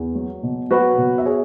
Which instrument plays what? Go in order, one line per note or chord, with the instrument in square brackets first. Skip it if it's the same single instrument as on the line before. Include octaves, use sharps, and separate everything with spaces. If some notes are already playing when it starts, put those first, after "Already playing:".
Already playing: [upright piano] E2
F#3
B2
F#3 F#4 B4
B2
E5
G#4 C#5